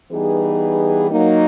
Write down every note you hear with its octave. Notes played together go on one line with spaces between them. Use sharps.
E3 G3 B3 D#4 G#4
F#3 A#3 D#4